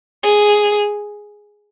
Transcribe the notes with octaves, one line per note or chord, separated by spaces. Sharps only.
G#4